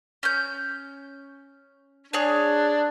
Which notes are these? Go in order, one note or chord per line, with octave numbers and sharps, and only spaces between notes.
C#4 G6
D4 G#4 C#5